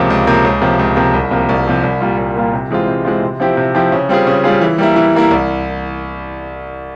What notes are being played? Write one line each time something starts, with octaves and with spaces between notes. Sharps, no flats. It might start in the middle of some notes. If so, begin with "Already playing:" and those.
Already playing: C#2 C3 F3 A#3
C#2
C3 F3 A#3
C#2
C3 F3 A#3
C#2
C3 F3 A#3
C2
C3 F3 A#3
C2
C3 F3 A#3
C2
A#2 G3 A#3 F4
C2
A#2 G3 A#3 F4
C3
E3 G#3 C4 F4
C3
E3 G#3 C4 F4
C3
F3 C4 E4 G4
C3
F3 C4 E4 G4
C#3
G3 C4 F4 G#4
C#3
G3 C4 F4 G#4
E3
G3 A#3 E4
E3
G3 A#3 E4
C2